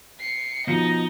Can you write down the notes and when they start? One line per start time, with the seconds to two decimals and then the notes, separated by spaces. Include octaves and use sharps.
0.20 C7 C#7
0.67 B2 F3 D#4 D#5 C#7